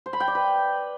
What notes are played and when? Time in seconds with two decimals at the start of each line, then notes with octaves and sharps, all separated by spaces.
0.06 C5
0.13 B5
0.20 G5
0.28 D5
0.35 B4